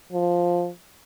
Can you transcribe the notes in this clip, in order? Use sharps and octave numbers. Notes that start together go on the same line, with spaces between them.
F3